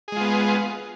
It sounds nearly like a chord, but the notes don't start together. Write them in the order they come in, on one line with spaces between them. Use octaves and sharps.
G#4 G#3 F4 B3